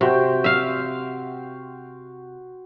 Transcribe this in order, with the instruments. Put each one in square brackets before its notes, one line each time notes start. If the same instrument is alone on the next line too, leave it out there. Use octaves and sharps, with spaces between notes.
[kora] C3 [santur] F#4 C5 G5
[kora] E5 F5